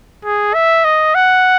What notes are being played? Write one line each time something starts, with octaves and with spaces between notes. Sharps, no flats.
G#4
E5
D#5
F#5